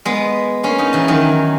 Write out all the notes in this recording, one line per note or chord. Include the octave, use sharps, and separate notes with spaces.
G#3 B3
A#3 C#4
B3 D#4
C#3 E3
D#3 F#3